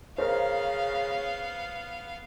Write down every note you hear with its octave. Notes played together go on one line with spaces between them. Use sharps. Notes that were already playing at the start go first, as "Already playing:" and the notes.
C#3 B3 A#4 C5 F5